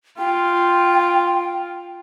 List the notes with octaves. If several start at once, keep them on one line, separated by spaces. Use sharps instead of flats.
F4 G5